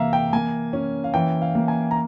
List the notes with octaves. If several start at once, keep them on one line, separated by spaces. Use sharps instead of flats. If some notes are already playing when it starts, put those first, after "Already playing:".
Already playing: C3 E3 A#3 E5 F5 A#5
G5
A#3 G#5
C#4
F5
E3 G5
F5
A#3
G#5
A#5